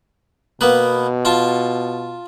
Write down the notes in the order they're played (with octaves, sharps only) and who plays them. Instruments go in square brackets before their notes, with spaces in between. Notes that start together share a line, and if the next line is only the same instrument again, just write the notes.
[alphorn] B2 [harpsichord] A#3 B3 B4
[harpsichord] F4 A5 C#6